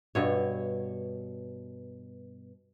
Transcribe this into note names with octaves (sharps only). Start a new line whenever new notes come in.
G2 B2 C#5